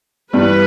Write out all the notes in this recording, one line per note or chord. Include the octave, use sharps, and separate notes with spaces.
G2 E3 G3 B4